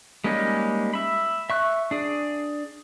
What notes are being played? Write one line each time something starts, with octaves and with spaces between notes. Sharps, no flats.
G3 G#3 A#3 C#4 D#4
E5 B5
E5 C#6 F#6
D4 G#4